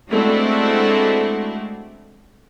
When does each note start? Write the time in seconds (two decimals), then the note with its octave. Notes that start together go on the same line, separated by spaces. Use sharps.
0.11 G#3 A3 C4 D4 E4 F#4